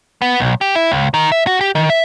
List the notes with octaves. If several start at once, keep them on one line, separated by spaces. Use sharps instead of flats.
B3
B1
G4
E4
C#2
D#3
E5
F#4
G4
D#3
E5